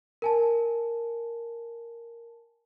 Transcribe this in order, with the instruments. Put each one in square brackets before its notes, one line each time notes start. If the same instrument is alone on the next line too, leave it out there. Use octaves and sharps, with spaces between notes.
[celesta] A#4 G#5 A5